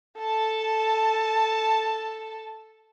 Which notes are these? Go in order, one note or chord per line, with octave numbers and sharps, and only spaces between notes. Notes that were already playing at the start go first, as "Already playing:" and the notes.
A4 A5